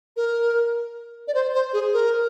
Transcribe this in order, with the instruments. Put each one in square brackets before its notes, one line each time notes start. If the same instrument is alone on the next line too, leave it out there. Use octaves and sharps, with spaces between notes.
[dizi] A#4
D5
C5
C5
G#4
A#4